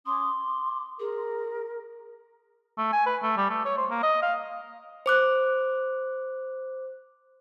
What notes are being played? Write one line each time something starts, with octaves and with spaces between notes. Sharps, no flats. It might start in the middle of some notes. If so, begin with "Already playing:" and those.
C#4 C6 D6 D#6
D6
G#4 A#4
A3
G#5
B4
A3
G3
A3
C#5
C5
A#3
D#5
F5
C5 D6 F#6